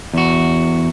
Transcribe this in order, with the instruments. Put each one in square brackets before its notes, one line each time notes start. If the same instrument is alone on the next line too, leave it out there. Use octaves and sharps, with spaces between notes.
[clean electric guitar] E2 F#4